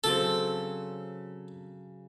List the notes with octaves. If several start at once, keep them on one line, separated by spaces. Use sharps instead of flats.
C#3 F#3 C4 A4